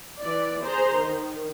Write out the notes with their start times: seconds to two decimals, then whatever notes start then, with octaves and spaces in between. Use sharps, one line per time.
0.23 E3 D5
0.64 G#4 C5 A#5
0.97 D#3